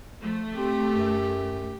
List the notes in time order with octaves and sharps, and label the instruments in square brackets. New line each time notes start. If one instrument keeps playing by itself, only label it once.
[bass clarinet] F3 [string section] A3
[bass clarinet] C4 [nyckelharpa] G4
[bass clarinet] F#2